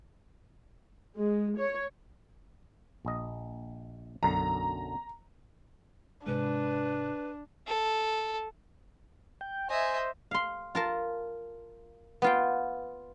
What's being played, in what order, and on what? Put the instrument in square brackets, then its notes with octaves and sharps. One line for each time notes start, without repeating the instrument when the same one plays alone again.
[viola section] G#3
C#5
[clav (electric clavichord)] A#1 D#5
[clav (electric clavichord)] B1 F#2 D3 [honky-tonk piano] A#5
[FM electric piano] G#2 C3 G#3 [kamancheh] D4 [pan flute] B4
[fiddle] A4
[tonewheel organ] G5
[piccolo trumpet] C5 [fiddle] D#5 E5 [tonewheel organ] G#5
[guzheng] F5 C6
F4 A#4 A5
B3 F4 G5